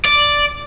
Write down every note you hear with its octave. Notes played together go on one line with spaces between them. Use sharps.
D5